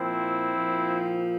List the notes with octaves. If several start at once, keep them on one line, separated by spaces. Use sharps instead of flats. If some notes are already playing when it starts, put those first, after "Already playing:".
Already playing: A#2 F3 C4 E4
A#2 F3